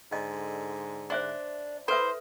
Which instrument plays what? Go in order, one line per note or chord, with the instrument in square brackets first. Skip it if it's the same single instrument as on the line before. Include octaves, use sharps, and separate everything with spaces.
[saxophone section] G#2 D3 [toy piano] D#5
[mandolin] D4 [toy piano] C5 E5 C6
[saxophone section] E4 [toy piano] A4 B4 E5 [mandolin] C5